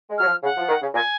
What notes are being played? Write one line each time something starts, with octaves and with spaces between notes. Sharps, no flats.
G#3
F#3 F6
F3
C#3 F#5
F3
D#3
C#3
A#2 G#5